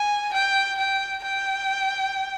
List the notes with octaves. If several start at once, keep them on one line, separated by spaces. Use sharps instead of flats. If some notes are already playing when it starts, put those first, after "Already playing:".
Already playing: G#5
G5
G5
G5